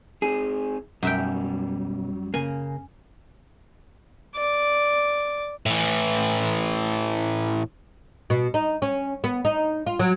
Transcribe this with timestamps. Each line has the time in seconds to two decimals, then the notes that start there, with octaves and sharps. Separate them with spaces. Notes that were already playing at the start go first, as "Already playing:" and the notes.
0.22 C4 D#4 G#4
1.03 B1 F#2 F#3 G3 E5 G5
2.34 C#3 A#3 G#5
4.36 D5
5.66 A2 E3
8.30 B2
8.54 D#4
8.82 C#4
9.24 B3
9.45 D#4
9.86 F4
9.99 F#3